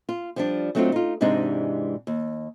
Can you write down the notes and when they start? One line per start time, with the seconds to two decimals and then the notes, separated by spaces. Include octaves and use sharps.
0.09 F4
0.36 F3 G3 D4
0.75 F#3 A3 C4 D4 D#4 F4
0.92 D#4 F4
1.21 G#2 C3 E3 G#3 D4 D#4
2.07 D#2